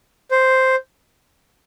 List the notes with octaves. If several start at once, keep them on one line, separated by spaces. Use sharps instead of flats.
C5